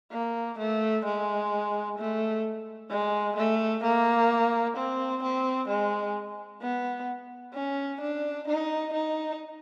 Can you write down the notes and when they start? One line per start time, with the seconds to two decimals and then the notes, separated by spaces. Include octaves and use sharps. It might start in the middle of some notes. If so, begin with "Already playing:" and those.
0.12 A#3
0.59 A3
1.05 G#3
1.98 A3
2.90 G#3
3.37 A3
3.83 A#3
4.77 C4
5.23 C4
5.68 G#3
6.62 B3
7.54 C#4
8.01 D4
8.48 D#4
8.93 D#4